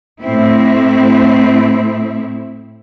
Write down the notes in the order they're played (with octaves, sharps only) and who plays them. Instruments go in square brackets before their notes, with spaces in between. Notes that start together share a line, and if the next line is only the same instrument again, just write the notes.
[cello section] A2 A3 C4 E4